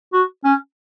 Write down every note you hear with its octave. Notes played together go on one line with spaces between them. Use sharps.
F#4
C#4